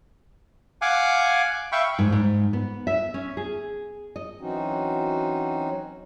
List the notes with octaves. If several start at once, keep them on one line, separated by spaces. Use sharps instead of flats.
F5 F#5 G#5 D6
E5 F5 G5 B5 C#6
G#2
G#2
B3
E5
C#4
G#4
D#5
E3 F#3 C4 C#4 D#4 F#4